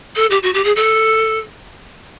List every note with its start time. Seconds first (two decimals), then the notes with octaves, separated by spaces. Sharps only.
0.15 A4
0.30 G4
0.42 F#4
0.53 G4
0.64 G#4
0.75 A4